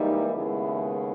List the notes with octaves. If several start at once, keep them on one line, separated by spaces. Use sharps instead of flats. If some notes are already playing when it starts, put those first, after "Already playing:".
Already playing: G#2 E3 G3 A#3 D#4
D#2 C#3 G#3 B3 E4